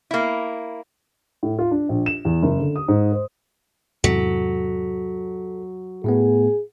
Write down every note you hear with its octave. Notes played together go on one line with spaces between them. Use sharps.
A#3 E4
A2
F4
D4
A#1
E7
E2
F#1
D3
D#6
G#2
C5
E2 G#2 C3 F#3 A4 B6
A2 A3 B3 G#4